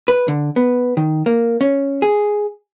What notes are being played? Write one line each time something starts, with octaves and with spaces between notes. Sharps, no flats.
B4
D3
B3
D#3
A#3
C#4
G#4